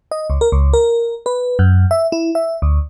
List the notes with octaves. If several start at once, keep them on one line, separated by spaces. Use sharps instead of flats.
D#5
C#2
A#4
C#2
A#4
B4
F#2
E5
E4
E5
D2